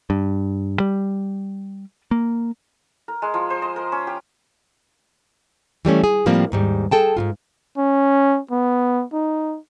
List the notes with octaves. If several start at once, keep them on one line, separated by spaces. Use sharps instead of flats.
G2
G3
A#3
A#4
G#3
F3
C5
D#5
A#4
C#4
G4
E3 G3 A3 C#4
G#4
A2 F3 G3 A#3 C4
D#2 G#2 G3
G#4 A4 G5 A5
G#2 B2 F4
C#4
B3
D#4